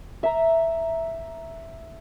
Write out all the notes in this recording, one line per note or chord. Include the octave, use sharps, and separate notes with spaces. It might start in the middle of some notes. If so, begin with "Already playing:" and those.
E5 A#5